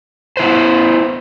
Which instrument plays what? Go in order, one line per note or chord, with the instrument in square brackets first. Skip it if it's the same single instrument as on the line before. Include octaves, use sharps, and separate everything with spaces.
[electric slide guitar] B3 E4 B4 C5